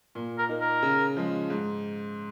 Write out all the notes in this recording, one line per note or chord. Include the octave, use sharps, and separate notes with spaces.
A#2
A#4
A#3 D#4
A#4
C#3
F3 G#3
G#2